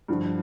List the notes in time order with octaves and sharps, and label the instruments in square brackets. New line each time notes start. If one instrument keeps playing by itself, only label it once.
[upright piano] G2 D3 F3